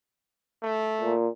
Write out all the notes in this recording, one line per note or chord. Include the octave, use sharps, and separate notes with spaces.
A3
A#2